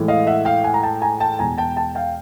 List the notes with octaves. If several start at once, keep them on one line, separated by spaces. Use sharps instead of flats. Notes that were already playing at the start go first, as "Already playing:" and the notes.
Already playing: A2 E3 G#3
D#5 F5
E5 F#5
F5 G5
F#5 G#5
A#5
G5 A5
G#5 A#5
G5 A5
E2 B2 G#3 G#5 A#5
G5 A5
G5 A5
F5 G5